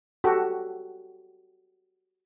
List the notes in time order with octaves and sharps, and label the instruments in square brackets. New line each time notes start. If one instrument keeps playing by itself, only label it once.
[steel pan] F#4 G4 A4